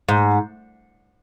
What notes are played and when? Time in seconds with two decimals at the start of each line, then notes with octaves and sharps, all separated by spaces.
0.09 G#2